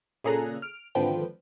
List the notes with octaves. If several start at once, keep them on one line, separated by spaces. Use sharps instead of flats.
A#2 C#3 G#4 A4 A#5 F#6
F6 D7
G#1 D3 F3 B4 G5